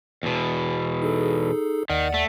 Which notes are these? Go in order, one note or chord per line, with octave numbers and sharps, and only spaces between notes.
E2 B2
D#4 G#4 A4
D#2 D#3 D5 F#5
A3